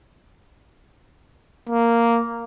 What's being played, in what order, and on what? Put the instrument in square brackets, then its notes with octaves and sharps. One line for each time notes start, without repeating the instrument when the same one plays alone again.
[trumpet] A#3